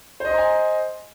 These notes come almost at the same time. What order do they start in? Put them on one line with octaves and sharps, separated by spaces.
C5 D#5 C6 A#5 G#5